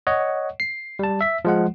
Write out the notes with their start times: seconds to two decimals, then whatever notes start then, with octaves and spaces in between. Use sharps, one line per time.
0.07 C#5 D#5 F#5
0.60 C7
0.99 G3 A5
1.21 E5 B6
1.45 F3 G#3 F#5